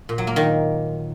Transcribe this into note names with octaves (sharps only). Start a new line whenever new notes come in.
A#2
F#3
A#3
D#3